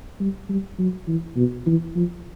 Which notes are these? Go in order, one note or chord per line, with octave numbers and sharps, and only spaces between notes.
G3
G3
F#3
E3
B2
E3
F3